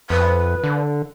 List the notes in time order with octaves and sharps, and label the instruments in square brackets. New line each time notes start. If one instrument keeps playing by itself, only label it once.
[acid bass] F2 [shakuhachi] B4
[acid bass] D3